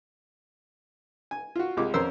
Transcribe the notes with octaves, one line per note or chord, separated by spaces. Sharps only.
G#5
F4 F#4
C2 G#3 F4 D6
F2 C#4 A#4 C5 E6